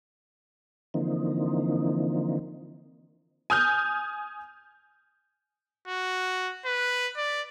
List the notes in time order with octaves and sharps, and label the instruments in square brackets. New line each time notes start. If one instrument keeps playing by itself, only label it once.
[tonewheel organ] D3 E3 F3 A#3 C4 D#4
[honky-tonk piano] G#5 D#6 F6 G6
[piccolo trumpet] F#4
B4
D5